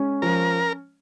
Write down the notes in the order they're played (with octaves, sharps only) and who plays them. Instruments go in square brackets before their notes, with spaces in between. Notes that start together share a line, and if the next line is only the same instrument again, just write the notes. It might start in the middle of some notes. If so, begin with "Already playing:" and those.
Already playing: [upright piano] G#3 C#4
[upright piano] F3 [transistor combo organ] A#4